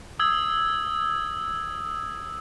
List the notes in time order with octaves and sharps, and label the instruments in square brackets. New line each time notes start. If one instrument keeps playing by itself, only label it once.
[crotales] D#6 E6 G#6